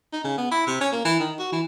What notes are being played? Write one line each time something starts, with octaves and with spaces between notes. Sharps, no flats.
D#4
C#3
B3
E4
C3
C#4
A#3
E3
D#3
F#4
E3